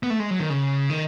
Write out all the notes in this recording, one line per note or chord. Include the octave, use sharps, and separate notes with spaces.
B3
A3
G#3
F#3
D#3
C#3
D#3